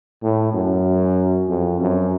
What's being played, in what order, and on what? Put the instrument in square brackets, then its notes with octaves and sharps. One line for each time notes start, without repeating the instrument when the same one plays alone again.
[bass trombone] A2
F#2
F2
F#2